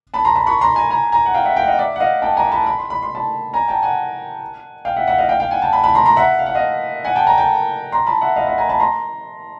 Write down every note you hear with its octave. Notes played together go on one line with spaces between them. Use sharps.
A5 B5
A#5 C6
A5 B5
B5 C#6
A#5 C6
G#5 A#5
G#5 A#5
G#5 A#5
F#5
F5 G5
E5 F#5
F5 G5
F#5
D#5 F5
D5 E5
F#5
D#5 F5
G5 A5
G#5 A#5
A5 B5
B5
C6
B5
C6
A5 B5
G#5 A#5
G5 A5
F#5 G#5
F5 G5
E5 F#5
E5 F#5
D#5 F5
F5 G5
F5 G5
F#5 G#5
G5 A5
A5 B5
A5 B5
A#5 C6
A#5 C6
E5 F#5
F5
F#5
D#5 F5
F#5 G#5
G5 A5
G#5 A#5
G5 A5
A#5 C6
A5 B5
E5 F#5
D#5 F5
E5 F#5
G#5 A#5
A5 B5
A#5 C6